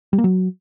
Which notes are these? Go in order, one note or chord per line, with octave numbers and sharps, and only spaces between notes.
G3
A#3
F#3